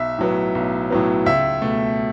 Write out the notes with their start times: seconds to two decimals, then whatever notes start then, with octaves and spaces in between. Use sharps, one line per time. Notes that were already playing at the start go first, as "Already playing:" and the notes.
Already playing: B1 E5
0.19 A2 F#3 B3
0.55 B1
0.90 A2 F#3 B3
1.26 C#2 E5
1.62 B2 A3